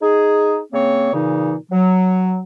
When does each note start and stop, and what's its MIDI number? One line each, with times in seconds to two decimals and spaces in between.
0.01 0.58 63
0.01 0.58 68
0.73 1.10 49
0.73 1.10 58
0.73 1.10 60
0.73 1.10 73
1.13 1.54 46
1.13 1.54 49
1.13 1.54 52
1.13 1.54 63
1.70 2.39 54